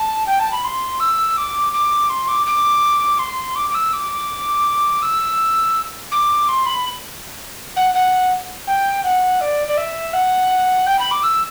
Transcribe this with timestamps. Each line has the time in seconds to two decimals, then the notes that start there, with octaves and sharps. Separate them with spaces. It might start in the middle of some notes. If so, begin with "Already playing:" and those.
Already playing: A5
0.26 G5
0.39 A5
0.51 B5
0.64 C6
0.99 E6
1.37 D6
1.72 D6
2.09 C6
2.27 D6
2.46 D6
3.18 C6
3.55 D6
3.70 D6
3.74 E6
3.92 D6
5.02 E6
6.11 D6
6.48 C6
6.65 B5
7.76 F#5
7.94 F#5
8.67 G5
9.03 F#5
9.40 D5
9.67 D5
9.77 E5
10.13 F#5
10.86 G5
10.99 B5
11.11 D6
11.23 E6